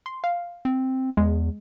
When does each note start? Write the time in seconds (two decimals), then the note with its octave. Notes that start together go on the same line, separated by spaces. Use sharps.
0.06 C6
0.24 F5
0.65 C4
1.17 E2 G#3